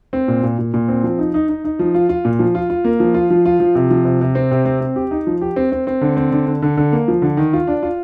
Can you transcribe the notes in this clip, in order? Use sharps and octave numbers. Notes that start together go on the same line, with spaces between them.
C4
A#2
A#2
A#2
A#2
C4
F3
D#4
D#4
D#4
D#4
F3
F4
F4
A#2
F3
F4
F4
A#3
F3
F4
F3
F4
F3
C3
F3
C3
C3
C4
C3
C4
C4
G4
D#4
F3
G4
C4
C4
C4
D3
C4
D3
D3
D3
D3
A#3
F3
D3
D#3
F4
D4
F4